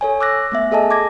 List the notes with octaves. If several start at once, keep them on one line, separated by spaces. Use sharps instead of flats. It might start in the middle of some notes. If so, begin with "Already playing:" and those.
A4 C#5 G#5
D6 E6 F#6 A#6
A3 B3 E5
G#4 A4 D#5 G#5 A5
D6 G#6 A#6